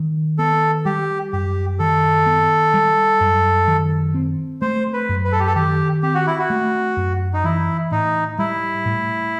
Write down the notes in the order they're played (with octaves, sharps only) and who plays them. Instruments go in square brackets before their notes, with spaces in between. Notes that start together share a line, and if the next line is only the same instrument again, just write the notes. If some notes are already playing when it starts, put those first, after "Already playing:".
Already playing: [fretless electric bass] D#3
[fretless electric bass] B3 [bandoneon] A4
[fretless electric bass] G3 [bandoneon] G4
[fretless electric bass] F#2 [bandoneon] G4
[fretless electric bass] D#3 [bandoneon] A4
[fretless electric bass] B3
G3
F#2
D#3
C4
[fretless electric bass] A3 [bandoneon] C5
[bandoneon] B4
[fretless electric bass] F#2
[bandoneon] B4
A4
G4
A4
[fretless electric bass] D#3 [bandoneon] G4
[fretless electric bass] C4 [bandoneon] G4
[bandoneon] F#4
E4
F#4
[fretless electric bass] A3
F#2
[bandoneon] D#4
[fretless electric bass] E3 [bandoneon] E4
[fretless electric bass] A2 [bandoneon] D#4
[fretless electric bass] G3 [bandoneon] E4
[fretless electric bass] A2